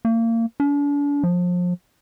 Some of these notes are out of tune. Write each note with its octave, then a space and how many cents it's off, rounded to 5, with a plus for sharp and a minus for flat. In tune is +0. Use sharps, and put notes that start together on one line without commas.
A#3 -30
D4 -40
F3 +30